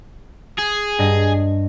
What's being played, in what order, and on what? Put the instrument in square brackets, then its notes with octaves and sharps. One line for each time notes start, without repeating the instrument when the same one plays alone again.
[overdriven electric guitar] G#4
[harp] G2 D#5